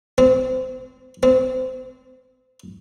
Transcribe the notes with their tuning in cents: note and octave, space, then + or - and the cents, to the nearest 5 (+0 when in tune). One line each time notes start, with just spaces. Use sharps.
C4 -25
C4 -25